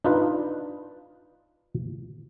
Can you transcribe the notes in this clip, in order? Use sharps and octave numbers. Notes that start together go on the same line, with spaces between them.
D4 D#4 F4 B4